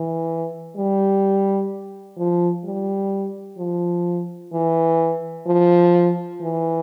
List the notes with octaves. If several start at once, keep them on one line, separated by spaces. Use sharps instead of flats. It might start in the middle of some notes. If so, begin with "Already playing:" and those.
Already playing: E3
G3
F3
G3
F3
E3
F3
E3